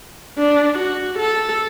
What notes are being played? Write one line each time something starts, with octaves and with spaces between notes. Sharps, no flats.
D4
F#4
A4